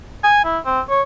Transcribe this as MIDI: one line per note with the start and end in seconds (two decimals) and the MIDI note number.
0.24 0.42 80
0.45 0.58 64
0.66 0.80 60
0.89 1.02 73